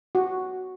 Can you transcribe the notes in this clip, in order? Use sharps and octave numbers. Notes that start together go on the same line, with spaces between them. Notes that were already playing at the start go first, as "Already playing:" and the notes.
F#4